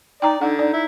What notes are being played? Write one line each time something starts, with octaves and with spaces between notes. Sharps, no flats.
D#4 D5 G5 A#5
D3 D#4 F#5
D#4 D5
E4